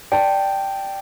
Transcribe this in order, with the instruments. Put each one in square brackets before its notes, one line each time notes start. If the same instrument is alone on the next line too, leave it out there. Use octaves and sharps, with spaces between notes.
[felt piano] D5 A5 [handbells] G5